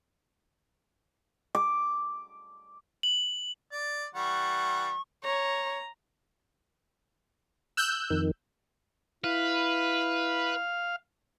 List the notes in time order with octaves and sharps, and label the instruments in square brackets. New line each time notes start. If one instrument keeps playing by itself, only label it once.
[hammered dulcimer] D6
[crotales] F#7
[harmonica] D5
[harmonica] E3 G3 F#5 [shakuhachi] C#6
[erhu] C#5 [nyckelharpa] A#5
[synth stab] E6 F#6 G6
[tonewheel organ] F2 D#3
[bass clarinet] E4 [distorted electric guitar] B4 [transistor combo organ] F5